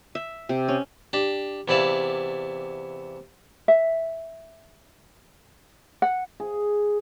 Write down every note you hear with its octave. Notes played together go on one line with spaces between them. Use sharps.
E5
C3
C#4
D4 G4
E2 C3 E4 D5 F5 A5
E5
F#5
G#4